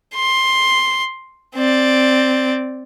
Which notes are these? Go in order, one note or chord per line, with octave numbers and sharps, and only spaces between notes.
C6
C4 D5